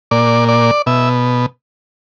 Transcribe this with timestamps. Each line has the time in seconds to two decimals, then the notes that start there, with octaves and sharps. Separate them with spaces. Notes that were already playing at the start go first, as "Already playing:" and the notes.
0.11 A#2 D5
0.48 D5
0.86 B2 E5